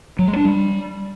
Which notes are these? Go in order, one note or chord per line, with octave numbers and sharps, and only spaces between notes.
F#3
G#3
D4
G3